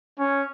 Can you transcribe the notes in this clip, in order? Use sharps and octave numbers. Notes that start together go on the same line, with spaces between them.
C#4